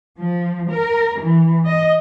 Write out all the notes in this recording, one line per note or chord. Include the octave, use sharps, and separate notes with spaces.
F3
A#4
E3
D#5